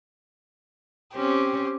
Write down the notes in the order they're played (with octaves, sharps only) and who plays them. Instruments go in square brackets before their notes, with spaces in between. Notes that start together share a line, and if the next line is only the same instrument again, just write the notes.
[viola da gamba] C4 C#4 [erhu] G4